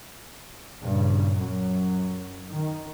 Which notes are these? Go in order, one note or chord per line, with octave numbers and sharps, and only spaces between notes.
G2 A#2 C#3
F#2 F#3
D#3